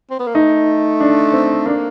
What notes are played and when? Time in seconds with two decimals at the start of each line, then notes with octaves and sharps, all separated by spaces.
0.11 C4
0.19 B3
0.27 A#3
0.35 A3 D#4
1.00 D4
1.33 C4
1.66 A#3 D4